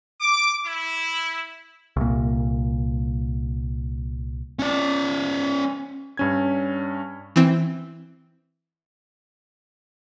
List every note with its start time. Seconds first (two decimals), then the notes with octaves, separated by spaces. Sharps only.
0.20 D6
0.65 E4
1.97 C2 A#2
4.59 C#4 D5
6.17 G2 C#4 G#6
7.36 E3 C4